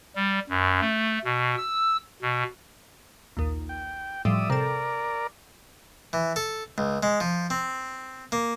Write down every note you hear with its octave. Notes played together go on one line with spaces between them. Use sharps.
G3
F#2
A3
B2
E6
B2
A#1 D#2
G5
A2 F3 G3 D5 E5 D#6
C3 A4 A#4 D5
E3
A4
C#2
G#3
F3
C4
A#3